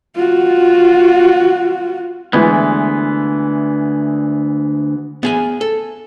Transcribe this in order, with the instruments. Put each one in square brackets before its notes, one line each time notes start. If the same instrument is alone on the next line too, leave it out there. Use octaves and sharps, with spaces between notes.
[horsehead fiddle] F4 F#4
[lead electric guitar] D2 [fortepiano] E3 G#3 B3
[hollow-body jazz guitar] B3 G#4 G#5
A4